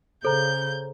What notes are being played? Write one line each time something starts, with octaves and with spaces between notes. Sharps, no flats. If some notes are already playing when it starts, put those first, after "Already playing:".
C#3 A4 C5 A#5 G6